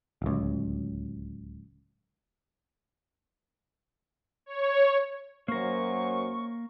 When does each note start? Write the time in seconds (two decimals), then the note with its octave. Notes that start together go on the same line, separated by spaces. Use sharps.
0.22 D1 C#2
4.46 C#5
5.48 F#2 F#3 A#3 A#4 C5 C#6